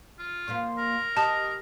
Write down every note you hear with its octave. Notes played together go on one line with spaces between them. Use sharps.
F4
A#2 F3 A#3 C6
A#4
G4 D#5 A5